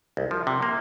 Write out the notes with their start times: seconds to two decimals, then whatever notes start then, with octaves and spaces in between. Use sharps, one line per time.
0.17 C2
0.31 F3
0.47 C3
0.62 A#3